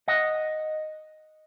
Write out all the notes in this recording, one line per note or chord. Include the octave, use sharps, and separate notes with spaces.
D#5 F#5